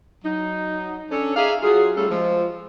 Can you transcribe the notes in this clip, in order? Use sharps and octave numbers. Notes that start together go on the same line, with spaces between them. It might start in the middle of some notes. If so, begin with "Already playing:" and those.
F#3 D#4
C#4 D4 A4
D#4 G#4 D5 E5 F5
F#3 F4 G#4
G3 A3 C#4 F4 G#4 A4
F3 G#3